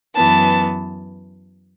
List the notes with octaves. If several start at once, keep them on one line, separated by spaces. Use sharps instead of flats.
F#2 E3 B3 A5